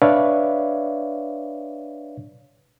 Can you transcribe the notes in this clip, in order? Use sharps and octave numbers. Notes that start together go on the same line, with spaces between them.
D4 B4 C#5 D5 E5 F5